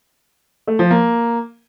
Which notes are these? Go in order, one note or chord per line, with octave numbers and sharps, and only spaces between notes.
A3
F3
A#3